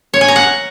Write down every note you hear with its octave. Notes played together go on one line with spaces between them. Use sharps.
C#5
G#5
A#5
F#5